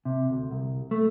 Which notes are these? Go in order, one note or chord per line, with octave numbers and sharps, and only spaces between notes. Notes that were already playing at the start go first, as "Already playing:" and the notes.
C3
D2
C2
A3